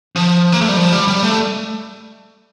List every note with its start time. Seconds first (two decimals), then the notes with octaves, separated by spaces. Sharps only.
0.16 F3
0.52 A#3
0.61 A3
0.69 G3
0.77 F3
0.92 G3
1.08 G3
1.23 A3